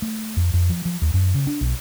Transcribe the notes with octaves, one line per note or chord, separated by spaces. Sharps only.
A3
F2
F2
F3
F3
D#2
F#2
C#3
D4
B1